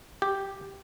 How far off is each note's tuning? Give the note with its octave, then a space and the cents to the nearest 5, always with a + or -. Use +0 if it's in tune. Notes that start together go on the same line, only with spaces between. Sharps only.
G4 +0